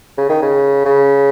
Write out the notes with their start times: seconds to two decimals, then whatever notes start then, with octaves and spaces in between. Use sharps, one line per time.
0.18 C#3
0.29 D#3
0.42 C#3
0.85 C#3